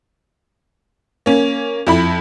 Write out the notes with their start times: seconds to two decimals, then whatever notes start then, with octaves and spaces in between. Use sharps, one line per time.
1.26 A#3 C#4
1.87 F2 E4 B5